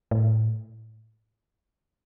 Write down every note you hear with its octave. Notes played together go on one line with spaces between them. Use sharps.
A2